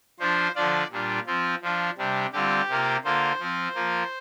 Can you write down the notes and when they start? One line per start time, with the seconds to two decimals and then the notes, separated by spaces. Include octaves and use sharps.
0.20 F3 D4 F4 C5
0.55 D3 F3 D4 F4 D5
0.91 A#2 G3 D4 F4
1.27 F3 C4 F4
1.62 F3 D4 F4
1.98 C3 G3 D4
2.33 D3 G3 C4 F4 G4
2.69 C3 A#3 F4
3.04 D3 A#3 F4 C5
3.40 F3 C4 F4
3.75 F3 A#3 F4